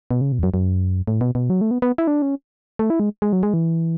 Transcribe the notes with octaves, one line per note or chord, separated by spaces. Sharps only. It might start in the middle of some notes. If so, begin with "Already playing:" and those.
B2
C#3
B2
E2
F#2
F#2
A2
B2
B2
F#3
A3
B3
B3
E4
D4
C#4
A3
E4
G#3
G#3
F#3
G#3
E3